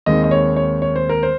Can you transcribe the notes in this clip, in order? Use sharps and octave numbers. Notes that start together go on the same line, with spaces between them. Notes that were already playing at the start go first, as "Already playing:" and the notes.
D#2 D#3 G#3 C4 D#5
D#5
C#5
C#5
C#5
C5
A#4
C5